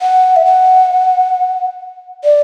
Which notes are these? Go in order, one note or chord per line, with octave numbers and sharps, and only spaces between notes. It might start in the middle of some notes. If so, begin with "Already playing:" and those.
F#5
E5
F#5
D5